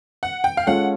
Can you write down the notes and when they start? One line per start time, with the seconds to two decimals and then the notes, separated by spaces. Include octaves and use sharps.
0.23 F#5
0.44 G5
0.57 F5
0.67 G#3 C#4 F4 A4 F#5